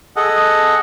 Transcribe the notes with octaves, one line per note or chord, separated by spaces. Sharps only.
G#4 A4 D#5 F#5